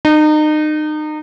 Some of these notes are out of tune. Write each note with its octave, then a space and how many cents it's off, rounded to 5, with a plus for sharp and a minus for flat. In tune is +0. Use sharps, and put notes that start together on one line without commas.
D#4 -30